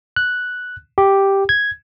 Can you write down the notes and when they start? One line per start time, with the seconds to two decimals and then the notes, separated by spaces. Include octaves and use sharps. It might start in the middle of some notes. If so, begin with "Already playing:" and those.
0.16 F#6
0.98 G4
1.49 G#6